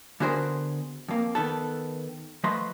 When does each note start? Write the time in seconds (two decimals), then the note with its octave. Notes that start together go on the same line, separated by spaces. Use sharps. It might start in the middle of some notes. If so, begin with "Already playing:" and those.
0.20 D3 B3 F#4 G#4 A#4 C5
1.09 F2 A#3
1.35 D#3 B3 A4
2.44 F3 A3 B4 D#5 C6